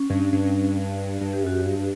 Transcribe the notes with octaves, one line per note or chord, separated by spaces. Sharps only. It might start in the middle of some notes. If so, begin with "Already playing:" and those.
Already playing: C#4
G2
G2
G2
G4
F#2 F#4
G4
G2